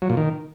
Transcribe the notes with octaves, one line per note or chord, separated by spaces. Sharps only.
F#3
A#2
D#3